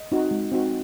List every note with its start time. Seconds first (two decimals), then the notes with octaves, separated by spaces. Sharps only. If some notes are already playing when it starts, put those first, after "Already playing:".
Already playing: D#5
0.12 C4 D#4 F#4
0.31 G#3
0.52 C4 D#4 F#4